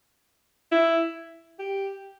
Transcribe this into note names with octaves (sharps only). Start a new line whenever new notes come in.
E4
G4